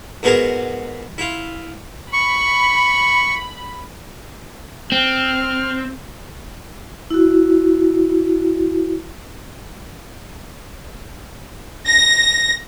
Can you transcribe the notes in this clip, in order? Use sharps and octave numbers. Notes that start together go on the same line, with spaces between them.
G#2 B3 F#4 G#4 A#4 G#5
E4 F4
B5 C#6
C4 F6
E4 F#4
A#6